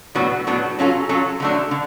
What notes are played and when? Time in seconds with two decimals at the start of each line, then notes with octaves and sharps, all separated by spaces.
0.15 A2 F#3 B3 D4 F#4
0.47 A2 F#3 B3 D4 F#4
0.79 F#3 C#4 F4 A4
1.09 F#3 C#4 F4 A4
1.40 D3 F#3 A3 D4
1.71 D3